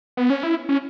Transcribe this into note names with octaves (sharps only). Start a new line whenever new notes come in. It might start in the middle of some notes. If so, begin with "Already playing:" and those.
B3
C#4
E4
C#4